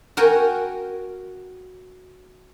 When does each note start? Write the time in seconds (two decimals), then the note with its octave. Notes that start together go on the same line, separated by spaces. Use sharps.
0.17 F#4 A#4 G5 G#5